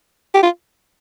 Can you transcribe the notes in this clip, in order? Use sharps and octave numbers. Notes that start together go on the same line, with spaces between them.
G4
F4